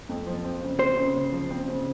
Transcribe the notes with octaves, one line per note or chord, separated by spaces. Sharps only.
F2
F3
C4
C#3
C4 C5
C#3
C#3
F3
C4
C#3